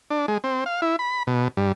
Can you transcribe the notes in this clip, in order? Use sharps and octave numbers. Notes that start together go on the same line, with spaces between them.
D4
G#3
C4
F5
E4
B5
B2
G2